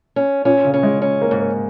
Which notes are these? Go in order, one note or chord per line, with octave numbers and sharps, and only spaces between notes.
C#4
A#2 C#4
C#3
C#4
G#3
C#4
A#3
G#2
A#3